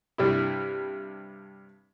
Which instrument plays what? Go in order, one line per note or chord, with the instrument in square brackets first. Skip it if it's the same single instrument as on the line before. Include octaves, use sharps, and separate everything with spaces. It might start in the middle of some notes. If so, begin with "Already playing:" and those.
[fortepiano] G2 C3 D4 E4